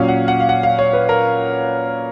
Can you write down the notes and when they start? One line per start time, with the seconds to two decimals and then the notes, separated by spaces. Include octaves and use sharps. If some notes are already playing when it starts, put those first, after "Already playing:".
Already playing: A#2 F#3 C#4 F5
0.08 F#5
0.28 F#5
0.40 F5
0.49 F#5
0.63 F5
0.79 C#5
0.93 B4
1.09 A#4